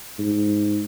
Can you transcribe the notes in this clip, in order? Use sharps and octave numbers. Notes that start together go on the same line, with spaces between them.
G#2